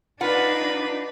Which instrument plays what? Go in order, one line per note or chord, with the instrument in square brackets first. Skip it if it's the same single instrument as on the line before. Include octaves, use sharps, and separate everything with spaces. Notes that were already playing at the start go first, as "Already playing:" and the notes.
[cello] D4 D#4 [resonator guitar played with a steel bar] F4 F#5 [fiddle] B4